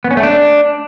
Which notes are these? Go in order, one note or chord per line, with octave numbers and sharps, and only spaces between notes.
B3
C#4
A3
D4